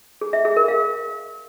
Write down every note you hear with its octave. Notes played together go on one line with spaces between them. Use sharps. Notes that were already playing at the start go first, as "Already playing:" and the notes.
G#4
E5
G#4
A#4
F5